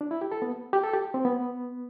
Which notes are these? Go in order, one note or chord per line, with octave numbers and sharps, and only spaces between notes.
D4
E4
G4
A4
B3
G4
A4
G4
C4
B3